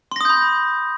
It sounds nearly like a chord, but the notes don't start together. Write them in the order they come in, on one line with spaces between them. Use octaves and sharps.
C6 A#6 D#6 G6 B5